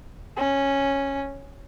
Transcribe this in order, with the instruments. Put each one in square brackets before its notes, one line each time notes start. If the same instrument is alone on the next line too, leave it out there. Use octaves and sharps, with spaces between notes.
[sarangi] C#4